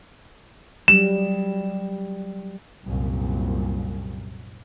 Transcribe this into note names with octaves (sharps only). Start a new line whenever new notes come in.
F#3 G3 E7
C2 F#2 A#2